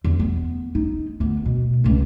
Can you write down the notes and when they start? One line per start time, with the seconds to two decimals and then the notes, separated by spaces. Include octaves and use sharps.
0.04 E2
0.19 B3
0.75 D#4
1.20 D2 B3
1.46 B2
1.84 C#2 A#3